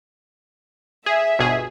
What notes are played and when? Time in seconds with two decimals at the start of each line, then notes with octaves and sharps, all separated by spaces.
1.06 G#4 E5
1.39 G1 B2 G#4